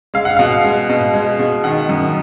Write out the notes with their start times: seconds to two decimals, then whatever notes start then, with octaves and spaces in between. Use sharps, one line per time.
0.14 G#3 F5
0.25 F#5
0.37 B2 F5
0.64 G#3
0.89 B2
1.14 G#3
1.39 B2
1.64 D#3 F#5
1.89 F#2